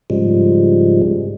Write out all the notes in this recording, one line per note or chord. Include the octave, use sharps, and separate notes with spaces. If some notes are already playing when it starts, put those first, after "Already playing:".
G#2 C#3 F3 G3 G#3